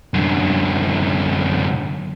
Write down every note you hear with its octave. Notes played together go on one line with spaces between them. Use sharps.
F#2 D3